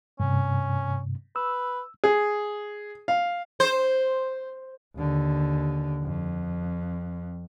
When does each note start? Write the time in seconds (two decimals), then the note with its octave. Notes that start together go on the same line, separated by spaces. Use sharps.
0.20 G2 C3 C#4
1.36 B4 E6
2.04 G#4
3.08 F5
3.60 C5
4.95 D#2 D3
6.03 F2